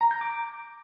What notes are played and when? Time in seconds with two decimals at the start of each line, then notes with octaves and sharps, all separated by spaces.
0.01 A#5
0.11 G6
0.21 D6